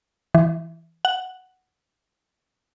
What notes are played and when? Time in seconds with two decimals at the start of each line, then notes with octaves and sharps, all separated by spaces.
0.35 E3
1.05 F#5